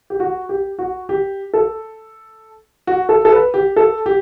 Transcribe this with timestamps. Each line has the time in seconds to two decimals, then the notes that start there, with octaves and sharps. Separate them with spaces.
0.10 G4
0.20 F#4
0.49 G4
0.79 F#4
1.09 G4
1.54 A4
2.87 F#4
3.09 A4
3.25 A4
3.32 B4
3.54 G4
3.76 A4
4.06 G4